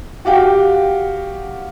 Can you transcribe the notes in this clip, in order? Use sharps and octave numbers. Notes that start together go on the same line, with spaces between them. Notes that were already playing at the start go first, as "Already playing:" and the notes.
F#4 G4 F5 G5